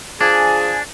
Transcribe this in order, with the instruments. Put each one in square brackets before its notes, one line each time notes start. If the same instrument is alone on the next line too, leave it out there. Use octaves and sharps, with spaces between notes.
[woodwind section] F3 G#4 G#5 [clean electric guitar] D4